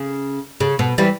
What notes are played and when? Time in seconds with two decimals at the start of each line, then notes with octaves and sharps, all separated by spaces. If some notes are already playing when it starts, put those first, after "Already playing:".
Already playing: C#3
0.60 C#3
0.79 B2
0.98 E3 G3